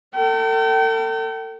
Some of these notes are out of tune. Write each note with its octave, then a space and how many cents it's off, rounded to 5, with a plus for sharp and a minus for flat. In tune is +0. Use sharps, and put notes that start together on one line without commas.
A4 +40 G5 -35